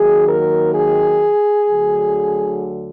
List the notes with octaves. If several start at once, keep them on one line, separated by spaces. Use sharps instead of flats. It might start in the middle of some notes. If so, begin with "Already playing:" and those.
Already playing: D#2 D#3 F#3 G#4
A#4
G#4
D2 D3 F#3